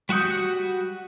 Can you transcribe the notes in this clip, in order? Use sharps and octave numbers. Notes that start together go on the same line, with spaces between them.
G3 F#4 F#5 D#6 G6